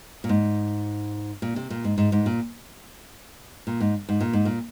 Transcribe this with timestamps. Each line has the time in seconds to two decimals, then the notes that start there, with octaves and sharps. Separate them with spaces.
0.24 A#2
0.29 G#2
1.42 A#2
1.56 C3
1.70 A#2
1.84 G#2
1.98 G#2
2.12 G#2
2.26 A#2
3.67 A#2
3.80 G#2
4.09 G#2
4.21 A#2
4.33 G#2
4.45 A#2